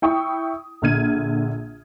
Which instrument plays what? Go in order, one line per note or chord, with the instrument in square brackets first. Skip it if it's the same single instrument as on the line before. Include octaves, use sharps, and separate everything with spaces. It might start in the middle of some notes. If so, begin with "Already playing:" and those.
[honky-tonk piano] E4 G5 C#6 D#6
A#1 D3 F6 G#6 D#7